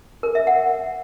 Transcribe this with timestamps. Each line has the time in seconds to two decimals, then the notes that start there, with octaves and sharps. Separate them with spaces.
0.23 A#4
0.35 E5
0.47 F#5